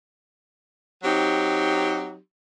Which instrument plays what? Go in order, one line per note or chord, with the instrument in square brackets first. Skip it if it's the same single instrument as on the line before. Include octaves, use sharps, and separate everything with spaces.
[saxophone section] F#3 C4 D#4 G4